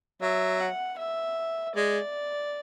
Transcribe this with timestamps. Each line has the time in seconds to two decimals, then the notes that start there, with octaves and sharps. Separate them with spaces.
0.22 F#3 E5
0.60 F#5
0.98 E5
1.75 G#3 D5